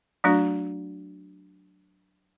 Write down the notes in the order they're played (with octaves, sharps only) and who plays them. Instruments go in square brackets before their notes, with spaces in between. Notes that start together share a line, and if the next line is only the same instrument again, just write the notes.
[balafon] F#3 A3 D4 F#4